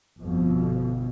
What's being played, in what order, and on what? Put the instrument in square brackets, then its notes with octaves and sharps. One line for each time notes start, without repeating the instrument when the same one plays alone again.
[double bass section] G1 F2 B2